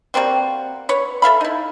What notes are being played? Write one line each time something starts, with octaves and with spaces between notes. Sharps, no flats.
G3 A#3 C4 F#4
B4 C#5
A4 E5 F5 B5
D#4 E4